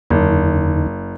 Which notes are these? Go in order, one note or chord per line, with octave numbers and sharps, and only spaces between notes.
F#1 E2 D3 D#4